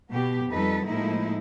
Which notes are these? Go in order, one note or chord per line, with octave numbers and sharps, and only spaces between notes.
B2 B3 G4
F2 G3 D#4 A4 B4
A2 F3 G#3 A#3 D#4 E4